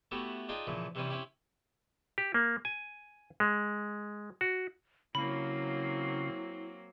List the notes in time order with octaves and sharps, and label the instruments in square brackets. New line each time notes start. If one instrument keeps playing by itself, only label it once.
[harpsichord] A3 B3 E4 F#4 G4
D4 D#4 F4 G#4 G5
A#2 C#3 E3 F3
C3 E3 G3 C4 C#4 E4
C4 C#4 E4 G4
[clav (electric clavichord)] G4
A#3
G#5
G#3
F#4
[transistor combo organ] C#3 [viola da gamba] F#3 A#3 C4 [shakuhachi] E4 [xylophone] B5